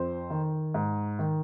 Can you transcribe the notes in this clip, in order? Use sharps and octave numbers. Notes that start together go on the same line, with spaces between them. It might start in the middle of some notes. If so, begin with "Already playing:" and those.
Already playing: F2 C5
D#3
G#2
D#3